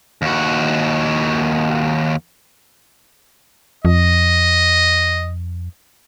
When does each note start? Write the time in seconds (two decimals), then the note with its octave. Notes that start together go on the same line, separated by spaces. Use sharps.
0.22 D#2 F#4
3.85 F2 D#5